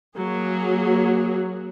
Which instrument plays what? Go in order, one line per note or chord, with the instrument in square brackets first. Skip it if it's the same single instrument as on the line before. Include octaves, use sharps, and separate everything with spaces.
[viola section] F#3 A#3 G#4